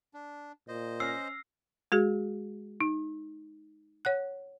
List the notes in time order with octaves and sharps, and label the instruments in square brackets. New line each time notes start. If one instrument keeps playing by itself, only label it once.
[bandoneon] D4
[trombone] A#2 [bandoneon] C5 D#5
[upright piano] C#4 F6 A#6 [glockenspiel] E6 C7
[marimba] G#3 F#4 G#4
D#4
C#5 F#5 F#6